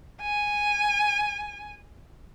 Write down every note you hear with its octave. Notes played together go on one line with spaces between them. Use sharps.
G#5